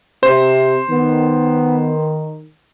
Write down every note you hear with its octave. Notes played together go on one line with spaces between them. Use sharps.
C3 C5
D#3 B3